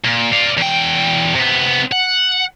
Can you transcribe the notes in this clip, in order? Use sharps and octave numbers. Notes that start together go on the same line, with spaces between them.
A#2
D5 F5
E2 G5
C3 B3
F#5